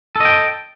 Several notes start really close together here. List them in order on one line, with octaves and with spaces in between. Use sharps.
A4 D#5 G5